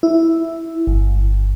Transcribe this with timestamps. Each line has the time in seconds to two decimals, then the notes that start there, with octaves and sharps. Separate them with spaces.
0.03 E4
0.87 G1